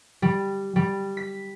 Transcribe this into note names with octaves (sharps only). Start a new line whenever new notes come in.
G3
G3
B6